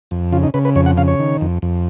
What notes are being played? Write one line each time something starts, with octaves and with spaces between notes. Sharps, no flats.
F2
C#3 F4
D#4
C#3 B4
B4
F2 C#5
F#5
C#3 F5
C#5
D#3
F2
F2